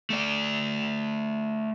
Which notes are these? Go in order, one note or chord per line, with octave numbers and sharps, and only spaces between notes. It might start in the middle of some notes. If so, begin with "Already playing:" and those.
A3 D5